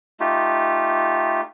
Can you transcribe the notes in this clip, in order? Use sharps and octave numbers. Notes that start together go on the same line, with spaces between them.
A3 D#4 F4 G4